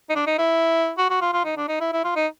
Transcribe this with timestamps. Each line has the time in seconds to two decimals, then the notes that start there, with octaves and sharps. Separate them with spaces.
0.10 D#4
0.15 D4
0.27 D#4
0.38 E4
0.98 F#4
1.10 F#4
1.21 F4
1.33 F4
1.45 D#4
1.57 D4
1.68 D#4
1.81 E4
1.93 E4
2.04 F4
2.16 D#4